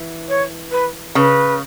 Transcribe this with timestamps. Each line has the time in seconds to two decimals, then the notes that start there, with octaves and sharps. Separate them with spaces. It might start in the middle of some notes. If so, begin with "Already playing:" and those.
Already playing: E3
0.29 C#5
0.72 B4
1.15 C#3 B4